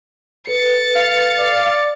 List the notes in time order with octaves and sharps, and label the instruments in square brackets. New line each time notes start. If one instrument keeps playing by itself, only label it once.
[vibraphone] A4 B4 [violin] A6 C#7
[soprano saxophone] F5
[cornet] D5